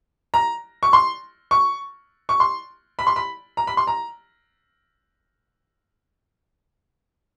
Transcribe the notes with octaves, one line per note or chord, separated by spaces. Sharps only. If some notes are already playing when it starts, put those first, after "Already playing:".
A#5
C#6
C6
C#6
C#6
C6
B5
C6
B5
A#5
B5
C6
A#5